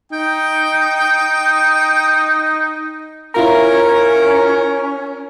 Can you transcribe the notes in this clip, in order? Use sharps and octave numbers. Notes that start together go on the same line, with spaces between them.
D#4 G5
C#4 E4 F4 A#4 A#5